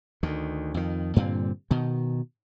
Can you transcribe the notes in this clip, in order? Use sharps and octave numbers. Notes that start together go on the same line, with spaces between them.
D2 D#3
F2 D#3
G2 A#2 D3 C4
B2 D#3